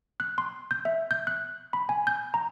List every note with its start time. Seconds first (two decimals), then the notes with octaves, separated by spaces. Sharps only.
0.20 F#6
0.38 C6
0.71 G6
0.85 E5
1.11 G6
1.27 F#6
1.73 B5
1.89 G#5
2.07 G6
2.34 A#5